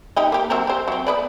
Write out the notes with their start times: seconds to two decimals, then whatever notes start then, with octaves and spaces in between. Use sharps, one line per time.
0.16 D#4 G4 D#5
0.32 A#3 G4
0.50 F#3 C4 A#4
0.67 G4 C5
0.88 F#3 C4
1.07 B3 B4 D5